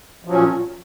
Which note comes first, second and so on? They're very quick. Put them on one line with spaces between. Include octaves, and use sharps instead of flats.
F3 F#3 C#4 A#2